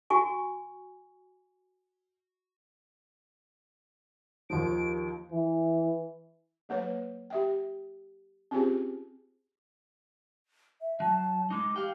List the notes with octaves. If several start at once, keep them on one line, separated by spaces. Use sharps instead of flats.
F#4 G#5 C#6
D#2 F3 D7
E3
F#3 A#3 B4 C#5
G4 E5 G5
C4 C#4 F4 G4 G#4 C5
E5
F#3 A5
G#3 D#4 D6
G4 F5 G5